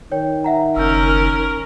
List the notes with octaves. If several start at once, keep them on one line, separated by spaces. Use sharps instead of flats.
D#3 C#5 G5
E5 F#5 A#5
F#1 C#4 A#4 E6 G6